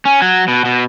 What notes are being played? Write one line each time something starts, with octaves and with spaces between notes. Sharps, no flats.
C#4
F#3
B2
B2